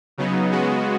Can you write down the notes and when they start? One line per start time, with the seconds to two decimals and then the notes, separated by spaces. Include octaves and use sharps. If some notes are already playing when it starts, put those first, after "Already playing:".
0.18 C#3 F#3 B3 D#4
0.52 C#3 G#3 B3 F#4